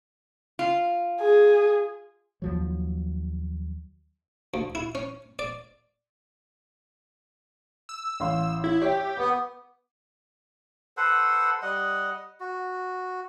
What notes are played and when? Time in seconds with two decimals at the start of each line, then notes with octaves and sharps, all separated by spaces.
0.59 F4
1.21 G#4
2.42 D#2 F3 F#3
4.54 D2
4.75 E4
4.95 C#4
5.39 D5
7.89 E6
8.20 A1 F5 C6
8.64 E4
8.82 G4 C#5 E5 G5
9.17 B3 D6
10.97 A4 B4 C5 F#5
11.62 G3 D#5 F#5
12.40 F#4